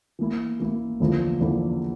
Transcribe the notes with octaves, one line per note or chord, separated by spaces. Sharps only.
E3 A#3 E4
E3 A#3 E4
E2 D3 F3 A#3 E4
E2 D3 F3 A#3 E4